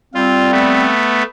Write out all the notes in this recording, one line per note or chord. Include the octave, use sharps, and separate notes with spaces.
G3 C4 F4
A3 B3